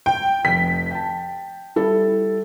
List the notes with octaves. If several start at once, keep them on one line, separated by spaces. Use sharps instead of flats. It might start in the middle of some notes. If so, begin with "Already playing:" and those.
G5
F1 B6
G5 A5
G3 E4 A4